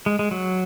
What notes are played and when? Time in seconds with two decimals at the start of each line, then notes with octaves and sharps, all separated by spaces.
0.06 G#3
0.19 G#3
0.31 F#3